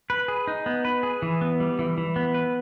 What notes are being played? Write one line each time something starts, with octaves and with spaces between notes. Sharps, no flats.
B4
G#4
D#4
B3
B4
G#4
E3
B3
G3
E3
E3
B3
B4